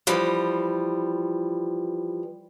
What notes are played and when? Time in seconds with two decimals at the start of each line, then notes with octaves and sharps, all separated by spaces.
0.07 E3 F3 G3